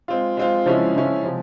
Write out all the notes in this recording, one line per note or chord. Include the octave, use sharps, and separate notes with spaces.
G#3 C4 F4
G#3 C4 F4
C#3 F3 G#3 C#4 E4
C#3 F3 G#3 C#4 E4
C3 F3 G#3